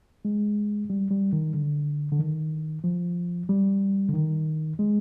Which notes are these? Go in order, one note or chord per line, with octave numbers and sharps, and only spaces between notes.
G#3
G3
G3
D#3
D3
D3
D#3
F3
G3
D3
D#3
G#3